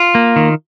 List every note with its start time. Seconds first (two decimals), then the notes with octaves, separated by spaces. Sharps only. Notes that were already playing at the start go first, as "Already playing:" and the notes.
Already playing: F4
0.15 A#3
0.36 D#3